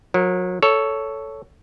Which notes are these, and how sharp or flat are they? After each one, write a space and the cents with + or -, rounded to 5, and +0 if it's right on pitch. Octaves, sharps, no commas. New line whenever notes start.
F#3 -35 A#4 +0
A4 +0 C#5 +10